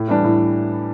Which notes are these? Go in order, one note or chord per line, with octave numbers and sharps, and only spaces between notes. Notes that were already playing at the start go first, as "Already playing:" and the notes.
Already playing: A2
E3 G3 D4
A2